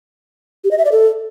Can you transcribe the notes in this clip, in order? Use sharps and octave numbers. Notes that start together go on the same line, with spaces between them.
G4
D#5
E5
D5
A4